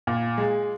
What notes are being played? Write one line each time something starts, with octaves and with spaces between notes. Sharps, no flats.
A#2
G#3